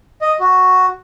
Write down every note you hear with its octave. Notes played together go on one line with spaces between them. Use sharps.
D#5
F#4